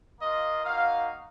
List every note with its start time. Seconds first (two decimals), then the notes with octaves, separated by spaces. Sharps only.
0.20 A#3 F4 D#5
0.64 A#3 D#4 F#4 F5